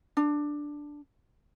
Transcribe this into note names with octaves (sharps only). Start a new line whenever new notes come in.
D4